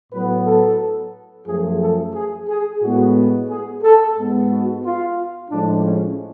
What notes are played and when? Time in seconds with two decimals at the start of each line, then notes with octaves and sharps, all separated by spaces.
0.11 A2 F#3 B3 B4
0.45 A4
1.46 F#2 F3 A3 G#4
1.80 A4
2.14 G#4
2.48 G#4
2.81 A2 G#3 B3 F#4
3.49 G#4
3.83 A4
4.16 G#2 G#3 B3
4.49 F#4
4.84 F4
5.50 A2 F3 G#3 D4
5.84 C#4